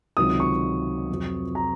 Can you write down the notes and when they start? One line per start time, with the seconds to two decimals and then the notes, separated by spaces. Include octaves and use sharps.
0.17 C#2 C3 D#3 F#3 D#6
0.40 C#6
1.10 F2 C3 F#3
1.55 A#5